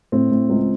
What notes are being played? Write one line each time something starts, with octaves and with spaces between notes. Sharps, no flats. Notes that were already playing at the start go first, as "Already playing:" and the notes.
A2 C4
A2
C#2